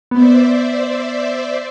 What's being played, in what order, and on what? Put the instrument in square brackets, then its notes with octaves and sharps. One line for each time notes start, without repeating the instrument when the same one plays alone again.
[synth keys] B3 [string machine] C5 D5 E5